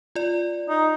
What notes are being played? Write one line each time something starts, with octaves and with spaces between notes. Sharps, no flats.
F4 D5
D#4